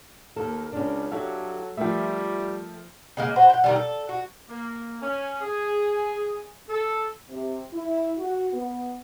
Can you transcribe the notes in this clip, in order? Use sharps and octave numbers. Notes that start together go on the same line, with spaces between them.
D#2 A#3 A4 A#4
C#2 C#4 D4
F#3 E4 G4 A4 F5
F3 G3 A3 A#4 E5 G5
C#3 G#3 A#3
F#4 B4 C5
F#5 G5
D#3 F3 G3
A4
F#4
A#3
C#4
G#4
A4
C3
E4
F#4
B3